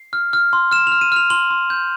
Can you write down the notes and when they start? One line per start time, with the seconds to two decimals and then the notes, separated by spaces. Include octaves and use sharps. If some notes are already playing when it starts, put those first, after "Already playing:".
Already playing: C7
0.13 F6
0.33 F6
0.53 C6
0.71 F6 E7
0.87 F6 F7
1.01 D#7
1.12 F6 F7
1.30 C6 F#7
1.51 C6
1.70 G6